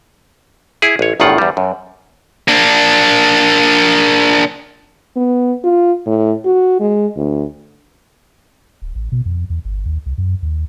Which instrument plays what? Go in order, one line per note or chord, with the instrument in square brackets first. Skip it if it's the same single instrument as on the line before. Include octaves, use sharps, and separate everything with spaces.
[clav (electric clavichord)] E4 G#4
A1 C#5
G1 E2 A2 D#3 F4 F#5
E2 G3
F#2
[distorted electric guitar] A#3 D4
[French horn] B3
F4
A2
F#4
G#3
D2
[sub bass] D1
A1
B2
F2
E2
G1
D#2
C2
F#2
D#2